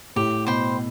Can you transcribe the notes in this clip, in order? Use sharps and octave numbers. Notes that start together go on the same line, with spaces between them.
A2 G4
B2 C5 G5 B5